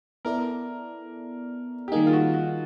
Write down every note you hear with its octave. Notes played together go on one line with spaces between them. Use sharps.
B3 E4 A4 A#4 D5
G4
D#3 G3 A#3 D#4 G#4
F4
F#4
F#4